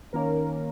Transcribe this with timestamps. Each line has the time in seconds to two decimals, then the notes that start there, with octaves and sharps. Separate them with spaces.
0.13 D#3 A#3 C#4 A#4